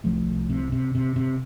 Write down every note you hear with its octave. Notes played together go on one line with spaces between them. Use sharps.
C2 F3 A3
C2
C3
C3
C3
C3